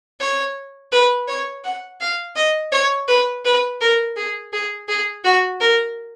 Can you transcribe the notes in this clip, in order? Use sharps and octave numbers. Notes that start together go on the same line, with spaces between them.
C#5
B4
C#5
F#5
F5
D#5
C#5
B4
B4
A#4
G#4
G#4
G#4
F#4
A#4